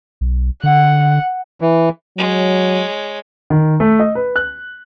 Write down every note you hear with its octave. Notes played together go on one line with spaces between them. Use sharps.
B1
D3 F#5
E3
F#3 G#3 C#5
D#3
A3
D#5
B4
F#6